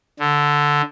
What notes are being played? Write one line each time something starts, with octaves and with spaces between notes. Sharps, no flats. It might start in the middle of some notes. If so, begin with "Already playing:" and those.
D3